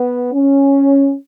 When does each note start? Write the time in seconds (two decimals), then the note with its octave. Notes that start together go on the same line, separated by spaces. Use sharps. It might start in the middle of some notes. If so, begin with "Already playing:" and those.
Already playing: B3
0.34 C#4